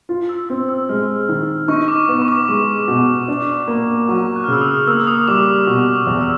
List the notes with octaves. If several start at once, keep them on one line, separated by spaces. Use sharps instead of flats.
F4
E6
C4 E6
E6
G#3 F6
D#3
D#4 C#6
D6
B3
C#6
D6
G#3 D6
B2
D4
A#3
F#3 C#6
F#6
F6
C#3 E6
D#6
A#3 E6
D#6
G3 D6
D6
B2 C#6
E2
E6